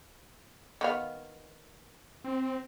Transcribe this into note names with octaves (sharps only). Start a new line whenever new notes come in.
D#3 B3 F5
C4